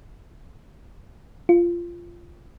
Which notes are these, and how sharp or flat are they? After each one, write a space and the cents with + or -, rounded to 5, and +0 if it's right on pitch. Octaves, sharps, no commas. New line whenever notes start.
F4 -15